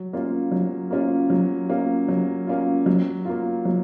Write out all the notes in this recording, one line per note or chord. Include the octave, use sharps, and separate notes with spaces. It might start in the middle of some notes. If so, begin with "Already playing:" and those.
Already playing: F#3
A#3 C#4 F4
F#3
A#3 C#4 F4
F#3
A#3 C#4 F4
F#3
A#3 C#4 F4
F#3
A#3 F4
F#3